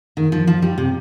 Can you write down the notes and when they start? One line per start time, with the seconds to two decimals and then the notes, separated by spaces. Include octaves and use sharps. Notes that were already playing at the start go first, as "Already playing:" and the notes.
0.17 D#3
0.32 F3
0.47 F3
0.62 G3
0.78 C3